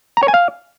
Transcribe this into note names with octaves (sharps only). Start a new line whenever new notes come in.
A#5
C#5
G#5
F5